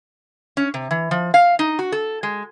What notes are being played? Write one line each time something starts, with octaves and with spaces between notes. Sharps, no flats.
C#4
C3
E3
F3
F5
D#4
F#4
A4
G#3